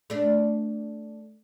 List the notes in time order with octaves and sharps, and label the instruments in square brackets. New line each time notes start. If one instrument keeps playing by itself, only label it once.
[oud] A3 D4